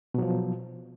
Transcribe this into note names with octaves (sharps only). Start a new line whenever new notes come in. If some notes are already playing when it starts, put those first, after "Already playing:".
B2 F3 F#3